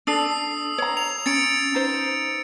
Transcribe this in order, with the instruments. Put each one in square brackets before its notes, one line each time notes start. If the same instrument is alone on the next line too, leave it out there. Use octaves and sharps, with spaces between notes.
[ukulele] D4 A4 [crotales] D#6 E6 C7
[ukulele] C#5 A#5
[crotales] F7
[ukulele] C#4 [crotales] A6 C#7 D7
[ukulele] D#4 C5